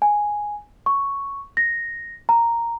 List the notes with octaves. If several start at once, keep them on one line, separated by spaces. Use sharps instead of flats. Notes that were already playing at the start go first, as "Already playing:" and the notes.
G#5
C#6
A#6
A#5